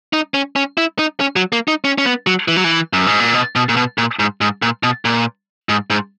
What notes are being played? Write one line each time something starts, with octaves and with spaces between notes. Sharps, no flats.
D#4
C#4
C#4
E4
D#4
C#4
F#3
A#3
D#4
C#4
C#4
B3
F#3
E3
F#3
E3
F#2
G#2
A#2
B2
B2
A#2
B2
A#2
G#2
G#2
A#2
B2
A#2
G#2
G#2